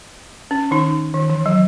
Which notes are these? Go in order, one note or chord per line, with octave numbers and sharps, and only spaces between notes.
C#4
D#3 D#4
D#3
E3
F#3